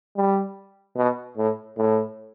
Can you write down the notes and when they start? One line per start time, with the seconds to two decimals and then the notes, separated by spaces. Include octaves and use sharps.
0.16 G3
0.96 B2
1.37 A2
1.77 A2